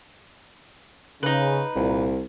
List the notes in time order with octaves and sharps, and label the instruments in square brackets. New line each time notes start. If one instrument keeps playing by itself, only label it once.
[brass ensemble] C#3 [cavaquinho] D#4 B4
[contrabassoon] C2 [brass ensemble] A#2